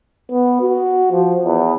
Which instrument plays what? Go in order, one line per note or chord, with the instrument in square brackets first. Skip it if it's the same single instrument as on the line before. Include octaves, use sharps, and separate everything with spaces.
[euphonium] B3
F#4
F3
E2